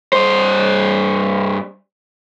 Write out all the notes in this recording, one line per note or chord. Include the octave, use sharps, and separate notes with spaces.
G2 C5